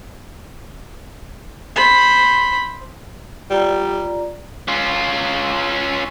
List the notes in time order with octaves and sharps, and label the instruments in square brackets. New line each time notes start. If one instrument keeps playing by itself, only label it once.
[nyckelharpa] C5 B5
[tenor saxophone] G3 [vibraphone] F4 D5 A#5
[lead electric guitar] C#4 F4